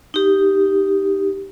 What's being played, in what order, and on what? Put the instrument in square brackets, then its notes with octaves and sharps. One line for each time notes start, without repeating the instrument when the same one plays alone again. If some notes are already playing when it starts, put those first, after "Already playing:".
[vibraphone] D#4 G4